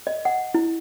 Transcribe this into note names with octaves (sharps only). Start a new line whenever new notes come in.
D#5
F#5
E4